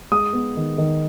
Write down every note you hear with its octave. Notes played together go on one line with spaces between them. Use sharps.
G#3 D#6
B3
D#3
D#3